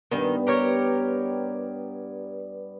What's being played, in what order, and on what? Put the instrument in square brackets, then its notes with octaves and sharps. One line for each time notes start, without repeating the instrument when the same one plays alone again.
[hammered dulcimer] G2 B3 [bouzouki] D#3 D#4
[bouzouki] G4 A#4 C#5